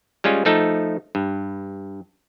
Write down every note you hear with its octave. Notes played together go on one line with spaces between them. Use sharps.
G3 G#3 C#4 F4
F3 A3 D#4 A4
G2